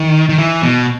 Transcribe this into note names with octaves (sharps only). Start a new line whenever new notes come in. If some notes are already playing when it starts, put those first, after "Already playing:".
Already playing: D#3
D#3
E3
B2